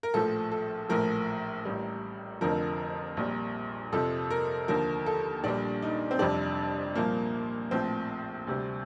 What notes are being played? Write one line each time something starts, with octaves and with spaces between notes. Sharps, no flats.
A#4
A#1 A2 F3 A4
A4
A#1 A2 F3 A#4
A1 A2 G3
F1 F2 D3 F3 A#4
A#1 A#2 G3
F2 C3 F3 A4
A#4
D#2 D3 F3 A#4
A4
A#1 A#2 G3 D4
D#4
C4
F1 F2 C3 G3 D4
C2 A#2 F3 A#3
A#1 A2 F3 C4
D2 C3 G3